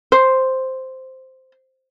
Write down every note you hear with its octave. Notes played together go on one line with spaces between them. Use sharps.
C5